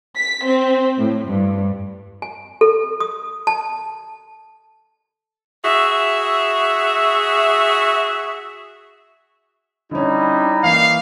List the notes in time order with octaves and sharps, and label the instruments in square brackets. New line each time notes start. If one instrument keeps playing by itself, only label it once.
[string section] B6
C4
A2
G2
[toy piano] G#5
A4
D#6
A5
[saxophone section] F#4 G#4 E5
[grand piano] D3 C#4 [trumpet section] G3 D#4 E4
[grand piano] E3 A#3 [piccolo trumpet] F5